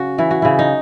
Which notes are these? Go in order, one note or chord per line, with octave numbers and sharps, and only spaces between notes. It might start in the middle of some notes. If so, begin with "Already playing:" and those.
Already playing: C#3 F#4
E3 E4
F#4
C#3 E4
D#4